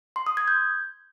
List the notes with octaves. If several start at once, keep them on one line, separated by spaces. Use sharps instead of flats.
C6
D#6
G#6
G6